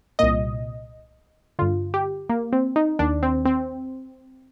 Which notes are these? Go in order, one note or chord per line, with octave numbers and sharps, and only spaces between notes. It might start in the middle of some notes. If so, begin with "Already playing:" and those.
C2 A#2 D#5
G2 D3 F4
G4
A#3
C4
D#4
D#2 D#3 D4
C4
C4